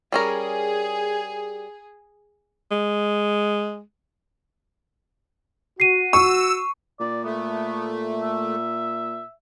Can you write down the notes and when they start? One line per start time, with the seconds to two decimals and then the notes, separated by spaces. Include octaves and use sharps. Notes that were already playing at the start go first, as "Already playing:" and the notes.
0.12 G3 C#4 G#4 A#4
2.71 G#3
5.80 F#4 C7 D#7
6.13 C#6 E6
7.00 A#2 D5
7.24 A3 B3
8.21 E5